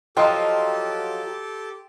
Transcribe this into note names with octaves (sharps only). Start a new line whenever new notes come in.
F3 F#3 D#4 G4 A4 G5 C6